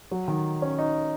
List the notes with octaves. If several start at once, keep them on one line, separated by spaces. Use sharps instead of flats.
F#3
D#3
C#4
D#4